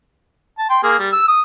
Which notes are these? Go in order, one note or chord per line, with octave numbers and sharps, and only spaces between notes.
A5
G5 C6
A#3 G#4
G3
E6
D#6